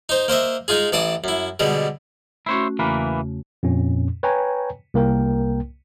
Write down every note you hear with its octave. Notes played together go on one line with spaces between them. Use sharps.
D#4 C5
A#3 C5 D#5 E5
G#3 D#4 F4 G#4
A1 E3 D5 A5 D#6
F#2 E4
B2 D3 G3 G#3
A3 C#4 E4 F#4 C5 C#5
E2 C#3 E3 A3 A#3 B4
F2 A#2 C#4
B4 C#5 G5 G#5 A#5
C2 A#3 A#4 G5